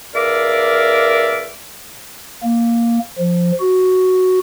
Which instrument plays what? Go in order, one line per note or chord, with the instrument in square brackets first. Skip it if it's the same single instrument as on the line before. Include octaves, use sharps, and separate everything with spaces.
[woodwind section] C#2 A#4 D5 E5 F5 D6
[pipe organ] A#3
F3
F#4